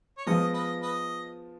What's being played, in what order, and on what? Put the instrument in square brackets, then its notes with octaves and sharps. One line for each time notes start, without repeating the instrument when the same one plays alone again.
[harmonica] C#5
[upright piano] F3 G#3 B3 F4 [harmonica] D#5
[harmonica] B4 D#5
B4 D#5